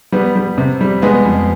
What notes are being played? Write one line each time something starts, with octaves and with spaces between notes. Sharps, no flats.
G3 B3
G3
C3
G3
G#3 B3
F2